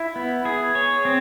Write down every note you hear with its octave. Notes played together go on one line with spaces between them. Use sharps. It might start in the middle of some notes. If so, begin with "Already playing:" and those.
Already playing: E4
B3
G#4
C#5
C4